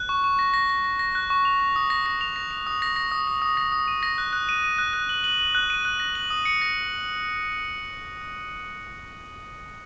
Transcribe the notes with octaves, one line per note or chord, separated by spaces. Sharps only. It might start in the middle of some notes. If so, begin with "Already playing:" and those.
Already playing: F#6
C#6
C#6
A#6
A#6
A#6
A#6
A#6
F#6
C#6
F7
F7
D#6
A#6
A#6
F7
A#6
F7
D#6
A#6
A#6
D#6
D#6
D#6
A#6
D#6
D#7
A#6
F#6
F#6
D#7
D#7
F#6
F#6
F#7
F#7
F#7
F#6
D#7
F#6
A#6
F#7
D#6
C#7
A#6